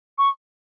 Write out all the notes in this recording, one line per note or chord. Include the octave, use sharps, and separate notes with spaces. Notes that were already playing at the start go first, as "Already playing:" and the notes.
C#6